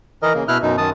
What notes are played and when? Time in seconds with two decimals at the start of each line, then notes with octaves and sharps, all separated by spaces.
0.22 E3 A#4 D#5
0.34 C#3 A#3
0.48 B2 E4 F6 F#6
0.62 F#2 B2 D#4
0.78 F#2 D#3 A5 D#6